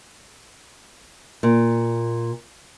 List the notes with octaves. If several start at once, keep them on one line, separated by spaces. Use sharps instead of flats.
A#2